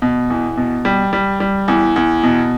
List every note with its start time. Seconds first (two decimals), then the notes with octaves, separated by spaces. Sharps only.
0.02 B2
0.30 E2
0.57 B2
0.85 G3
1.13 G3
1.40 G3
1.68 E2
1.96 E2
2.23 B2